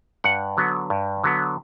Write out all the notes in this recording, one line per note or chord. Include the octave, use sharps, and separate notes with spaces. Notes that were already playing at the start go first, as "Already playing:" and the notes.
G2 F#5
D3 F#3 B3
G2
D3 F#3 B3